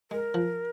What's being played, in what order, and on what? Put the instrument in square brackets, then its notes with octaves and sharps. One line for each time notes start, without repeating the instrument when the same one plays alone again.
[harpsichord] G#3 [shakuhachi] A#4
[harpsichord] F3